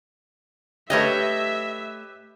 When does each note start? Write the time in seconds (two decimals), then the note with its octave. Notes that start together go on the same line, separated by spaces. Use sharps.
0.90 A3 G4 B4 C#5 D#5 E5